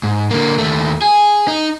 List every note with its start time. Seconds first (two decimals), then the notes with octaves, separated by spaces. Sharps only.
0.03 G#2
0.31 D3 A#3
0.59 D#2 A3
1.02 G#4
1.48 D#4